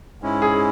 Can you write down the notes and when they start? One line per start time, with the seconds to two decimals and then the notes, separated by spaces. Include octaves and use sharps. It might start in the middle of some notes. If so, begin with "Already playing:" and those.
0.22 G#2 G#3 C#4 E4
0.42 G#4